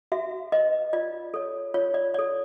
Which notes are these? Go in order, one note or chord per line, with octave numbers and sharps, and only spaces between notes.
F#4 E5
B4 D#5
F4 D5
A4 C#5
F4 C#5
D5
A4 C#5 D5